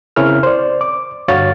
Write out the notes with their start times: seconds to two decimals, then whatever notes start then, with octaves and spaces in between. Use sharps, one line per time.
0.16 C#3 C4 C#4 E4 A#4 F6
0.43 C5 D5
0.81 D6
1.28 G2 D3 F#4 C#5 F5 A6